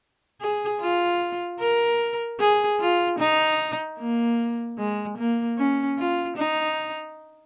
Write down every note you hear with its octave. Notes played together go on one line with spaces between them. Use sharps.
G#4
F4
A#4
G#4
F4
D#4
A#3
G#3
A#3
C#4
F4
D#4